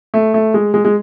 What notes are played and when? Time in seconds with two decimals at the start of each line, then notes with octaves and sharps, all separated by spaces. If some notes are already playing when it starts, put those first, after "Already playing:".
0.14 A3
0.34 A3
0.54 G#3
0.74 G#3
0.85 G#3